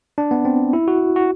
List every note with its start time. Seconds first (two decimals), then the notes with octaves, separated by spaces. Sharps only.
0.18 D4
0.31 B3
0.45 C4
0.73 E4
0.88 F#4
1.16 F#4